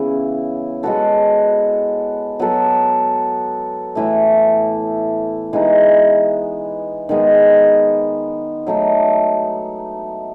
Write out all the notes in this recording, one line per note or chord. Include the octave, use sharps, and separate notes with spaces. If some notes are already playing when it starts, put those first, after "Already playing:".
Already playing: C#3 E3 B3 E4
G#3 B3 F#4 A4
F#3 B3 F#4 A4
A2 E3 A3
E3 G#3 B3 D#4
D#3 G#3 B3
F#3 A3 D#4